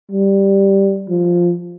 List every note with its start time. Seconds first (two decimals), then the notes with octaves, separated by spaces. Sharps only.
0.11 G3
1.09 F3